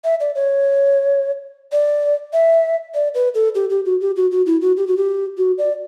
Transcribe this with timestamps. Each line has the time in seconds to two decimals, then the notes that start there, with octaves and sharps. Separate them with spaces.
0.04 E5
0.20 D5
0.35 C#5
1.72 D5
2.33 E5
2.94 D5
3.14 B4
3.35 A4
3.55 G4
3.70 G4
3.85 F#4
4.01 G4
4.16 F#4
4.31 F#4
4.46 E4
4.61 F#4
4.77 G4
4.87 F#4
4.97 G4
5.38 F#4
5.58 D5